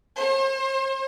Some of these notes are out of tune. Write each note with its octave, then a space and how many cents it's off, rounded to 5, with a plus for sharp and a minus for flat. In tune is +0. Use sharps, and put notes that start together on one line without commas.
C5 +45